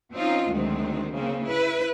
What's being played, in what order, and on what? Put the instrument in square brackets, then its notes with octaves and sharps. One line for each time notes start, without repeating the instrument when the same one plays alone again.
[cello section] F3 C4 C#4 D#4 F4
D2 D#3 F#3 G#3 C4
C#3 A#3 C4
E4 B4